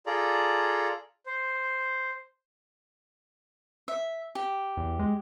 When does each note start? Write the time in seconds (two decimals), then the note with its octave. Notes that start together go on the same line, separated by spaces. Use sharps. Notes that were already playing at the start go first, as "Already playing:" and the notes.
0.06 F4 G#4 A4 D5 A#5
1.26 C5
3.88 E5
4.35 G4
4.77 E2
4.99 G#3